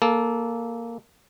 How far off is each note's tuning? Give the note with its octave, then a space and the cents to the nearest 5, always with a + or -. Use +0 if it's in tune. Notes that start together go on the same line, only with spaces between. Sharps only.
A#3 +0 A4 -15